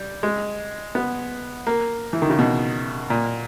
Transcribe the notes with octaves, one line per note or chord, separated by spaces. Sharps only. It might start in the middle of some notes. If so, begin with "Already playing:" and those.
Already playing: G3
G#3
B3
A#3
E3
D#3
C#3
B2
A#2